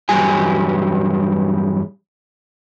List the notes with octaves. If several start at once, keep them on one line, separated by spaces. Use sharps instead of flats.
E2 G2 F#3 G3 G4 G#5